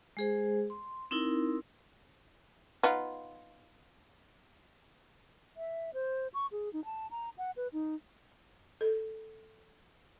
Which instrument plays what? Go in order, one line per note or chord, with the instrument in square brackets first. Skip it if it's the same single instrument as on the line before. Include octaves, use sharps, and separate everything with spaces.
[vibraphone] G#3 G#4 C5
C6
C4 D#4 E4 A#4
[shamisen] B3 D#4 F4
[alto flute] E5
C5
C#6
G#4
D#4
A5
A#5
F#5
B4
D#4
[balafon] A4